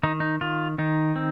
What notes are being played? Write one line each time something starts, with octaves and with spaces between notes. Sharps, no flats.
D#3 D#4
D#4
D#3 F4
D#3 D#4
C4